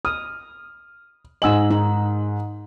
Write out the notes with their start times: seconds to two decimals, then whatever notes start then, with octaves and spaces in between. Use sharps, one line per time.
0.05 D#6 F6
1.42 G#2 D#5 G#5 E6 F#7
1.71 D#4